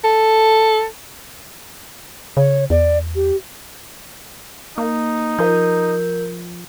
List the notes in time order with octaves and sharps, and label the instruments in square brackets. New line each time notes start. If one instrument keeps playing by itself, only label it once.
[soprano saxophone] A4
[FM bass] C#3 [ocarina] C#5
[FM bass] E2 [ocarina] D5
[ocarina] G4
[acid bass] A#3 [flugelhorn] D#4
[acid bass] F3 [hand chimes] A#4 G6